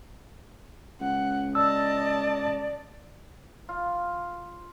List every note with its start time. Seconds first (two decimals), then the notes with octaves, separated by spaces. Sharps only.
1.01 C#2 F#5
1.55 D5 D#5 A5 E6
3.69 F4